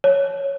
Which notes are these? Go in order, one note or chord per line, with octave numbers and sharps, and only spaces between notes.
C#5